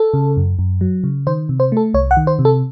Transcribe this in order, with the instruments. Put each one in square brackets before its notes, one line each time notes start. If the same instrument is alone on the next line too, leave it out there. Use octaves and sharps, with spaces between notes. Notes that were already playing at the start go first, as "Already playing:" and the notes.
Already playing: [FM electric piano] A4
C#3
F#2
F#2
F#3
C#3
D#3 C5
C3
C5
A3 A4
C2 C#5
F#5
D#3
C5
C3
A4